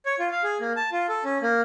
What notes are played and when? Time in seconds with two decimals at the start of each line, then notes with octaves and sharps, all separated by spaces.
0.06 C#5
0.19 F4
0.32 F5
0.44 G#4
0.60 A#3
0.76 A5
0.92 F4
1.09 A4
1.25 C#4
1.42 A#3